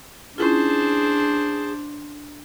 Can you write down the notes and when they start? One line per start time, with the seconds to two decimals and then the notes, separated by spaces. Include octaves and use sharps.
0.38 C#4 D4 E4 F4 G#4 C5 A5